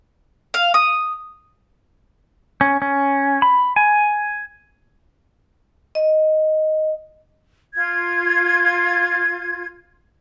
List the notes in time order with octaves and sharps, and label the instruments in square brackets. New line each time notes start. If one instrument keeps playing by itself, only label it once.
[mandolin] F5
D#6
[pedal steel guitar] C#4
C#4
B5
G#5
[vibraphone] D#5
[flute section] F4 G#6